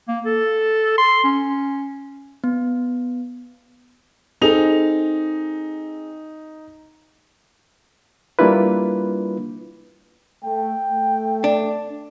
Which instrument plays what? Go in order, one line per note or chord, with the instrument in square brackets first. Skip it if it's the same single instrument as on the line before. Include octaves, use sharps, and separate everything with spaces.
[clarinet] A#3
A4
C6
C#4
[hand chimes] B3
[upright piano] C4 G#4 A4 [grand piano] D#4 F7
[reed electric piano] G3 A#3 D4 E4 F4 B4
[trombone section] A3 [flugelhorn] G5
[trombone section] A3
[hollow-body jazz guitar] D4